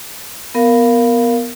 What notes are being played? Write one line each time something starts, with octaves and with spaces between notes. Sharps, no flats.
B3 A#4 F5